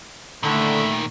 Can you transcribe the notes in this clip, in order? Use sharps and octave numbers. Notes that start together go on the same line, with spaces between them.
A#2 D3 D#3 A3 E4